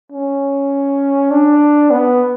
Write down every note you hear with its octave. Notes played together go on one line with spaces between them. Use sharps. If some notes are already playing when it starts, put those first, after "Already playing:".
C#4
D4
B3